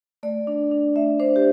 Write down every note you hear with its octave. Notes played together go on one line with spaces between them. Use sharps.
A3 D5
D4
D4
A3 E5
D4 C5
G4